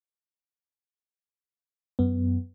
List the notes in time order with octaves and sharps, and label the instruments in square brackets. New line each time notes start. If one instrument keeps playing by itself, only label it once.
[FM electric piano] F#2 B3